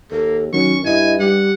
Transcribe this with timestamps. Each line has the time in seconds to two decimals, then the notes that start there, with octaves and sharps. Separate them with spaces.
0.11 D#2 A#3 A4
0.53 D#3 F#3 C#4 C#6
0.85 G2 E4 D#5 G#5
1.20 G3 G4 F#5